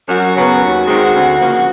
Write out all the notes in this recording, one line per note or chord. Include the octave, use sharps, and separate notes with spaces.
F#2 F#4
C#3 F#3 B3
D#2
D#3 G#3 C4
D2
C#3 F3 A#3